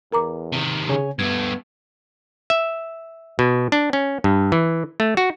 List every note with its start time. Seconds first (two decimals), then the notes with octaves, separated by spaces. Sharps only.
0.12 E2 A#4 A#5 D6
0.52 C3 D#3
0.89 C#3 G#4 C#5 G#5
1.19 G2 A3 B3 G#6
2.50 E5
3.39 B2
3.72 D4
3.93 C#4
4.24 G2
4.52 E3
5.00 A3
5.17 F#4